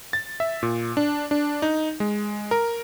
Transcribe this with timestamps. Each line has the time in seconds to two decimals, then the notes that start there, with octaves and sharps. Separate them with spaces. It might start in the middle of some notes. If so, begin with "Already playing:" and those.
0.13 A6
0.40 E5
0.63 A#2
0.97 D4
1.31 D4
1.62 D#4
2.00 G#3
2.51 A#4